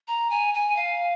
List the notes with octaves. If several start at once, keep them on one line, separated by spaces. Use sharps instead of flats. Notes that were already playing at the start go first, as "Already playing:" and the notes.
A#5
G#5
G#5
F5